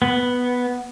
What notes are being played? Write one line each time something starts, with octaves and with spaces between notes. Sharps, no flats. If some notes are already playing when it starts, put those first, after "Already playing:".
B3